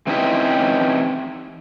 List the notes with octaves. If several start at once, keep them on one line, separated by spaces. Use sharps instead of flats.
E3 C4 C#4 D#4 E4 G4